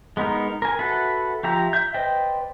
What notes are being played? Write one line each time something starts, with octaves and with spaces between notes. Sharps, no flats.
G#3 B3 D#4 A#4
A#4 G#5
F#4 A4 B4 E5 F#5
F3 G4 E5 A#5
E5 G6
B4 C5 D5 D#5 G5